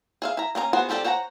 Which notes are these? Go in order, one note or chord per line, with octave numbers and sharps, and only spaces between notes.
G#4 E5 F5
E4 A#5
A#3 C#4 D#5 A#5
B3 F#4 G#4 C5 F#5
F3 C4 G4 A4 D5
C5 C#5 F#5 G#5 A#5